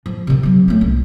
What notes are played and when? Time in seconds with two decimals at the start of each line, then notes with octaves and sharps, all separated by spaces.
0.06 F3
0.27 C3 D#3
0.43 F#3 C4
0.68 A3 C#4
0.81 C2